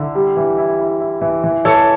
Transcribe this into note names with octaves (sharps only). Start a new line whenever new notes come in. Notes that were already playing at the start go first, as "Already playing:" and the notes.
Already playing: D3 E4
G3
E3
E4
E4
E4
E3
E3
E3 A4 C#5